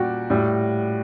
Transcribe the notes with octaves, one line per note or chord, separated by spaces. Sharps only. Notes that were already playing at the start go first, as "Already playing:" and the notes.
Already playing: A#2 G3 F#4 G4
A2 G3